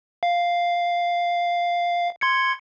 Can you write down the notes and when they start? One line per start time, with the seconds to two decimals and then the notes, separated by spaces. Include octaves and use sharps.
0.23 F5
2.21 C6 G#6 C#7